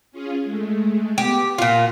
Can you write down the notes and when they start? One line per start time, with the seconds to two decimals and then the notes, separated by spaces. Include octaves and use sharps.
0.12 C#4 F4 G#4
0.44 G#3 A3
1.18 B3 G4
1.58 A#2 F4 F#5